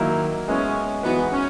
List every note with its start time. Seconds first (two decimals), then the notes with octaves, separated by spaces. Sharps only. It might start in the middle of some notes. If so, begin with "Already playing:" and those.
Already playing: D#3 F#3 A#3 E4
0.48 G#3 B3 C#4 E4
1.03 E3 G#3 B3 D#4 F#4 B4
1.31 C#4